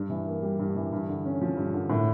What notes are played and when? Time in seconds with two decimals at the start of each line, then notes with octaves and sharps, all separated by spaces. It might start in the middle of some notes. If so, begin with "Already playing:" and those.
Already playing: G2
0.10 E3
0.27 A#3
0.43 G3
0.59 G2
0.76 E3
0.92 G2
1.09 D3
1.25 C#4
1.41 F3
1.57 G2
1.73 D3
1.90 A2